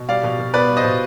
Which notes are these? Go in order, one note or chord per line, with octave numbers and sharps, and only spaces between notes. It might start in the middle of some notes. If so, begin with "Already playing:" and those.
Already playing: B2
G3 D5 F5
B2
B2
B3 B4 D5
G3
C5 D#5
B2